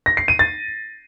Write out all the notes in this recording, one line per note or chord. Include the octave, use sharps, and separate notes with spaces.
A#6
C7
D#7
A6